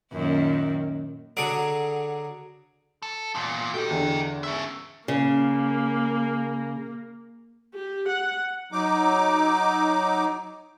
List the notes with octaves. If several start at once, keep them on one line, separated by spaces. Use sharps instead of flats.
F#2 A#2 D#3
D3 F#3 G#4 D6
A4
E2 A#2
F#4 G4 A4 D#5 G5
E2 D3
C#4 E5
C#3 A#3
G4
F#5
F#3 D#4 D6